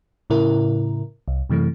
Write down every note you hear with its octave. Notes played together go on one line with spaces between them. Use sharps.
A2 C#3 E4 A#4
C2
F#2 C3 E3 A3